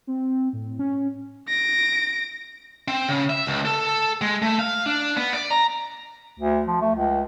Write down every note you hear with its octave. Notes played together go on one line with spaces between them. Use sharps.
C4
A2
C#4
A#6 D7
C4
C#3
E5
C#2
A4
G#3
A3
F5
D4
B3
D5
A#5
D2
F3
A3
C#2